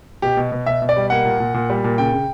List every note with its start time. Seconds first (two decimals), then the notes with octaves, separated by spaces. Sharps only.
0.22 B2 G4
0.37 B2
0.52 B2
0.66 B2 E5
0.82 B2
0.89 D5
0.97 G3
1.10 A#3 F#5
1.25 A#2
1.40 A#2
1.54 A#2
1.70 G3
1.84 A#2
1.98 C#3 G5
2.14 C#3